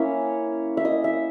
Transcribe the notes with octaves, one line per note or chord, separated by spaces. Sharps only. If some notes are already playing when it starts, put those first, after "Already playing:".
Already playing: A#3 C#4 E4 C#5
E5
D#5
E5